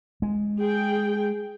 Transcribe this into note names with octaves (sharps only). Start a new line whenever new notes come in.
G#3
G#4 G5